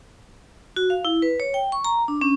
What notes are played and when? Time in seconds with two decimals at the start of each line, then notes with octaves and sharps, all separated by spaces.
0.76 F#4
0.90 F5
1.05 E4
1.22 B4
1.40 C#5
1.54 G5
1.72 C#6
1.84 A#5
2.08 D4
2.21 C#4